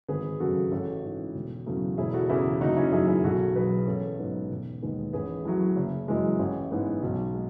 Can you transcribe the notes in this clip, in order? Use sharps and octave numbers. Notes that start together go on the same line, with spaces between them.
G#1 G#4 B4
F#2 C#3 F#4 A4
A1 F#4 A4
G#2 E3
E1
E2 C#3 F#3 A3
E1 E4 G#4
F#4 A4
E2 C#3 E4 G#4
F#1 D#4 F#4
C#4 E4
F#2 D#3 E4 G#4
E4 G#4
B1 F#4 A4
B2 F#3 B3 G#4 B4
A1 A4 C#5
G#2 F#3 B3
E1
D#2 D#3 G#3 B3
A1 G#4 B4
A2 F#3
F#1
F#2 E3 G#3
A1
G#2 E3 G#3 B3
B1
G#3